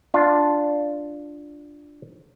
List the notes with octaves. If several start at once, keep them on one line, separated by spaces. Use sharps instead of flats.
D4 F4